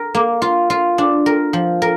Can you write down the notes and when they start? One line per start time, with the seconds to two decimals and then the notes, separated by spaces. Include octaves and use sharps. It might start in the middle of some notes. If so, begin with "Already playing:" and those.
Already playing: A#4
0.15 A#3
0.42 F4
0.70 F4
0.98 D4
1.26 A#4
1.53 F3
1.82 A#4